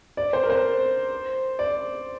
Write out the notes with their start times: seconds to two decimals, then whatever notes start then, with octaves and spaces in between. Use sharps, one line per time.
0.17 D5
0.33 C5
0.43 A#4
0.50 C5
1.59 D5